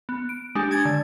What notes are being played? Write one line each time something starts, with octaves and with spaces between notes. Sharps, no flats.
B3
D7
G#3 D4 G4
G#5 G#6 A6
D3